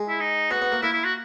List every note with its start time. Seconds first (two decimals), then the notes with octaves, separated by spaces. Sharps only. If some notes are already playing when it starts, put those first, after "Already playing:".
Already playing: G#3
0.08 E4
0.20 D#4
0.51 B3 F#4
0.62 B3
0.72 A#3
0.82 A#3 E4
0.93 E4
1.04 F#4